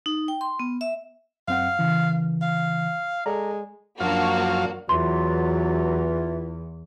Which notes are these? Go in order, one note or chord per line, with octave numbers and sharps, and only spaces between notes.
D#4
G5
C6
B3
E5
F#2 C4 F5 F#5
C#3 E3
F5
G#3 A4 D5 A#5
F#2 F3 A#3 D4 F#4 F5
E2 E3 F#3 F4 C6